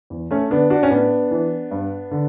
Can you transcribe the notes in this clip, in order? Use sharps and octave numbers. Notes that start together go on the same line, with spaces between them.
E2
A3 C#4
D3 B3 D4
D4 F#4
C#4
A2 B3 D4
E3
G2
D3